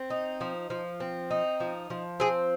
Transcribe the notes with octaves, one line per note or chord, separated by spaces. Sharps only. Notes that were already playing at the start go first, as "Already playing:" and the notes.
Already playing: C4
D#4
F3
F3
C4
D#4
F3
F3
C4 G#4